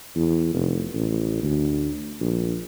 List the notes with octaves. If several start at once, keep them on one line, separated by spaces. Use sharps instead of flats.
E2
F1
A1
D2
A#1